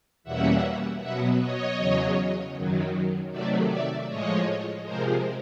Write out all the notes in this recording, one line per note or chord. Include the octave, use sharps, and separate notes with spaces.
E2 B2 G3 A#3 C#4 E5 F#5
B2 F#3 B3 E5 F#5
C#5 D#5
E2 C#3 F#3
F#2 D#3 F#3
C3 D#3 F#3 A3 D5 E5
D5 E5
A2 F3 G#3 C#5 D#5
C3 F3 G#3 A#4 C5